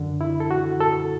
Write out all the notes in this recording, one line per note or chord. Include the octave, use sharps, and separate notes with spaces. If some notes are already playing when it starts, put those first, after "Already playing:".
Already playing: F#2 D3
E4
A4
F#4
A4